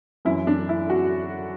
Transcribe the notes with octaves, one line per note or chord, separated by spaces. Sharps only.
F#2 E3 E4
D4
E4
F#4